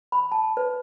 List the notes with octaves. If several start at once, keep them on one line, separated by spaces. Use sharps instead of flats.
B5
A5
B4